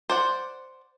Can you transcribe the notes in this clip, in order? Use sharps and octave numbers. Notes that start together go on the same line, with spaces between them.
C5 D5 F#5